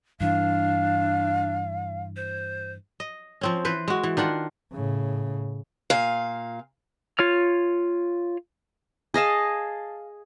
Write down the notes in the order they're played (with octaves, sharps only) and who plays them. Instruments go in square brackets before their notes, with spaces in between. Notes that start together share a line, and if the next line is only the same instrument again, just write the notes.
[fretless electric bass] G2 E3 [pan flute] D4 [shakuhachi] F5
[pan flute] C5
[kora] D#5
F3 C4 C#4
E3 B4 C5
G#3 F#4
E3
D#3 D4 F4 F#5
[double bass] A2 C#3
[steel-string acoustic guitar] A#2 F5
[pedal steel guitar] F4 C#5 F6
[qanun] G#4 D#5 F5 A5